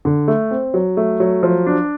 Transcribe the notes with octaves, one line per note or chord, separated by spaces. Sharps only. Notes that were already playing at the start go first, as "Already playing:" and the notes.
D3
A3
C4
F#3
A3
F#3
F3
D4